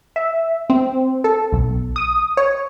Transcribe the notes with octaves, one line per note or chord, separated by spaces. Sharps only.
E5
C4
A4
B1
D#6
C#5